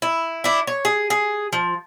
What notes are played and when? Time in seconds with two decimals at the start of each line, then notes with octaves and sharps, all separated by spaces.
0.02 E4
0.44 D4 E4
0.67 C#5
0.85 G#4
1.10 G#4
1.52 F3